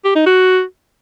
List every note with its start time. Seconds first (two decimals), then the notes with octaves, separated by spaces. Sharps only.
0.05 G4
0.15 D#4
0.26 F#4